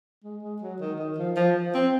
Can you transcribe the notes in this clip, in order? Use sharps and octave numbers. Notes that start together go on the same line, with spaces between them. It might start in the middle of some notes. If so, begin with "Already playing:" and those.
G#3
G#3
F#3
D#3
D#3
F3
F3
C4